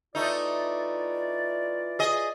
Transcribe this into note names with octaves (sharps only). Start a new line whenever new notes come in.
E3 A3 D#4 F4 D5
G#4 D#5